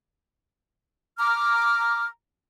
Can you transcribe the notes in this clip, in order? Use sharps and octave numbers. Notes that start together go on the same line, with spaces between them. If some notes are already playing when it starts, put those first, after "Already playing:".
A#5 D6 F6